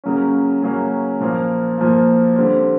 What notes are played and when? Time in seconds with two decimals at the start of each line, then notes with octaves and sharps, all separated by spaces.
0.04 C#3 F#3 A#3 C#4
0.63 C#3 F#3 A#3 C#4
1.20 A#2 F3 A#3
1.78 A#2 F3 A#3
2.36 D3 G3 C4